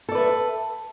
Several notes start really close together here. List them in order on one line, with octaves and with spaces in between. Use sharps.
A4 D5 B4 E5